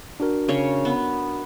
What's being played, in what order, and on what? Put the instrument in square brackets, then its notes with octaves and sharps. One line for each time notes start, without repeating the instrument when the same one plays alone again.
[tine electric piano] D4 F#4 A#4
[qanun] C#3 C#5
B3